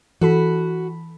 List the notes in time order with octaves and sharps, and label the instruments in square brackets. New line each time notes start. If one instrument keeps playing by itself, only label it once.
[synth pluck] E3 A4 B5 [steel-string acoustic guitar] F#4